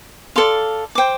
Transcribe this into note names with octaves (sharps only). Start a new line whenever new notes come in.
A4 D5 F5 C6
C5 G5 D6